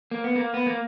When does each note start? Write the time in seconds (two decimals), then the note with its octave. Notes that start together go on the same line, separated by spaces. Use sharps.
0.11 A#3
0.24 B3
0.36 A#3
0.54 B3
0.67 A#3